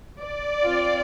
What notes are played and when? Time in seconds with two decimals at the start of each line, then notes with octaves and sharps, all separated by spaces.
0.22 D5
0.65 C4 F4